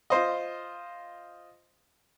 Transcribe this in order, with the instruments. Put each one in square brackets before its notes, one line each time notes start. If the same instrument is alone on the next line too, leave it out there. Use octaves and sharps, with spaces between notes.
[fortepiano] F4 C5 D#5